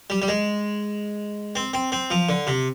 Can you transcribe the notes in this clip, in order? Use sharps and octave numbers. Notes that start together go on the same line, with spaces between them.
G3
G3
G#3
C4
C4
C4
F3
D3
C3